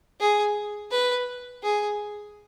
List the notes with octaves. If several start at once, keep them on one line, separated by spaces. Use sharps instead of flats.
G#4
B4
G#4